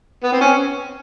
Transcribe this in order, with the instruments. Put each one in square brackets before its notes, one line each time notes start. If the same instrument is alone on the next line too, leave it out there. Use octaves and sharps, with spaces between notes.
[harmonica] B3
C4
C#4